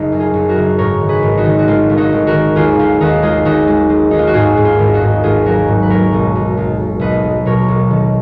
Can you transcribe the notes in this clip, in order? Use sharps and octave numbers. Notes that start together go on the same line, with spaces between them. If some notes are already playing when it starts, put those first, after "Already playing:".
Already playing: F#1 D#4
F#2
F4 G#4
F#1
F#4 A#4
F#1
G#2 A#4 C#5
D#3
G#4 B4
G#1
D#4 F#4
D#3
F#4
G#1 F4
G#1
D#4 F#4
G#1
F#4 A#4
D#3
D#2 F4 G#4
D#2 F4
D#2 D#4 F#4
G#3 F4 G#4
D#2 D#4 F#4
G#3
G#3
D#2 D#4
F4
F#4
G#2 F4 G#4
G#2
F4
G#1
D#4 F#4
G#2
G#1 F4 G#4
F#3 F#4 A#4
G#2
B4
F#3 A#4 C#5
B1
B1
B1
B1
B1 B4 D#5
F#3
B2 A#4 C#5
B1
D#3